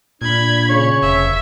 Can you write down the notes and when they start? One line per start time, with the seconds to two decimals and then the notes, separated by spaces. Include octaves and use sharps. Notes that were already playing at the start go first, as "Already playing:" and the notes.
0.22 A#2 D4 B5 G#6
0.69 C#3 C#5
1.02 F1 E5